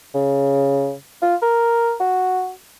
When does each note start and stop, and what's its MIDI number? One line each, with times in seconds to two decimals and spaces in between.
0.14 0.93 49
1.23 1.36 65
1.42 1.94 70
2.00 2.51 66